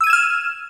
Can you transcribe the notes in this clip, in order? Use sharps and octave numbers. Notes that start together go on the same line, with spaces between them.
E6 F6 G#6 D#7 E7